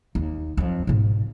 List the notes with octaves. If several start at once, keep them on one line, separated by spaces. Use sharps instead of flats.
D#2
F2 F#3
G#2 B2